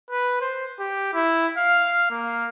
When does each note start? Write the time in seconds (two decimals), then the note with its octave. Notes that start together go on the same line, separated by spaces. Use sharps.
0.10 B4
0.41 C5
0.80 G4
1.14 E4
1.57 F5
2.10 A#3